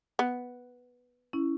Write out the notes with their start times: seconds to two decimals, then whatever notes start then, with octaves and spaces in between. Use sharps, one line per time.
0.19 B3
1.33 C#4 E4